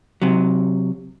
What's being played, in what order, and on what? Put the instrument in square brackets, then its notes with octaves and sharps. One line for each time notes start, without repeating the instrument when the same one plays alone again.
[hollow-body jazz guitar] C3 F#3